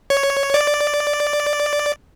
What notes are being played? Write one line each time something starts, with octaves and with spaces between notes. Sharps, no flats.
C#5
D5